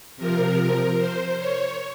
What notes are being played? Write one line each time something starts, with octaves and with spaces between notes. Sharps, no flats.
C3 F3 A#4
C5
C#5